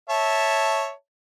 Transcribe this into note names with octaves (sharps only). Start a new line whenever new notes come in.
C#5 E5 A5